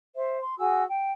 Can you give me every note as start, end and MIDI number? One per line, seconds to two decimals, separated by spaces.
0.15 0.40 72
0.15 0.40 76
0.40 0.58 84
0.60 0.82 66
0.60 0.82 68
0.60 0.82 80
0.60 0.82 88
0.88 1.11 79